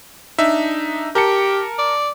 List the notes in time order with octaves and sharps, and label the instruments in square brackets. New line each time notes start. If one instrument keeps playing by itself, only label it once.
[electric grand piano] D4 D#4 E5
[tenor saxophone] G4 [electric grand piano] A#4 A5 C#7
[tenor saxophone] D5